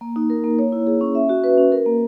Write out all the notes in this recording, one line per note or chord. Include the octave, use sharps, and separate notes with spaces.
A#3
D#4
A#4
A#3
C#5
E4
G#4
C#4
E5
F#4
B4
C#4
A#4
A#3